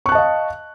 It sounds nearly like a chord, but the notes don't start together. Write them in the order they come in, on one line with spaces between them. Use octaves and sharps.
C#6 F#6 A5 D#5 F5